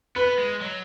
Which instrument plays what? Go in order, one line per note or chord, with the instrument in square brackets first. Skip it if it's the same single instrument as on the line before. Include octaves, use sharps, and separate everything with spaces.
[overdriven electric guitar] B3 [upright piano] B4
[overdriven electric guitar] G#3
F#3